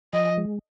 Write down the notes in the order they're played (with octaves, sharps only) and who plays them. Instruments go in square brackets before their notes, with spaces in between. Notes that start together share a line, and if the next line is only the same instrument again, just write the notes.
[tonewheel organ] F3 [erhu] D#5
[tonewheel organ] G#3